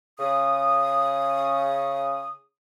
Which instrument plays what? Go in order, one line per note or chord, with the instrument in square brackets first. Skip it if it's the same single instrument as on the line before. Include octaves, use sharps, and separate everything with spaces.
[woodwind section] C#3 D#6